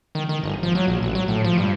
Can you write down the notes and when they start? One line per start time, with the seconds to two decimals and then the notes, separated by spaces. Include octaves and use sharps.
0.15 D#3
0.29 D#3
0.44 G1
0.63 F3
0.75 F#3
0.88 A#1
1.03 A1
1.15 F#3
1.28 A2
1.45 F3
1.58 G2